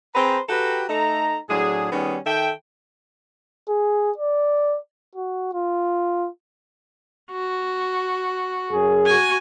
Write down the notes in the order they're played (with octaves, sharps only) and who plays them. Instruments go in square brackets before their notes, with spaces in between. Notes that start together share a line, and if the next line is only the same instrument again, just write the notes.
[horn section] C4 G#4 B4 C5 G5 A#5
F#4 G4 A4 B4 G5 A#5
A3 D#4 A4 A#5
A2 F#3 D4 G#4
D#3 G3 B3 C#4 G#4
D#3 A4 E5 G5
[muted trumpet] G#4
D5
F#4
F4
[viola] F#4
[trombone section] F#2 G#4
[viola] F#4 G#5